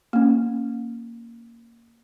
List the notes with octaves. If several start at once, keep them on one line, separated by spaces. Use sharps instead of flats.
A#3 C#4